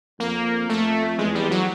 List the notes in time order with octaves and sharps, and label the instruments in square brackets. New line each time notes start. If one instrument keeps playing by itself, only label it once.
[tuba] F2 [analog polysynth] A#3
[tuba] F2 [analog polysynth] A3
[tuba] E2 [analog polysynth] G#3
[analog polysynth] G3
F#3